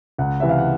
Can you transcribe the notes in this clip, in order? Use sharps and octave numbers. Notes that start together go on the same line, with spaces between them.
C#2 F#5
C3 E3 E5
F5
F#5